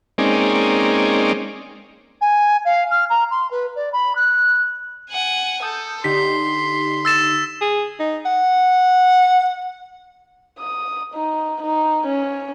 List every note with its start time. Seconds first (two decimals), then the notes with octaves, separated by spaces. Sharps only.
0.18 G#3 A#3 C4 C#4 D#4 D5
2.21 G#5
2.65 F5
2.91 F6
3.10 A#5
3.31 C6
3.51 B4
3.76 D5
3.93 B5
4.16 F#6
5.11 F#5 G#5
5.62 A4 D#6 G6
6.04 D3 D#4 G4 C6 B6
7.05 E6 A6 E7
7.61 G#4
8.00 D#4
8.25 F#5
10.59 D#6
11.14 D#4
11.62 D#4
12.06 C#4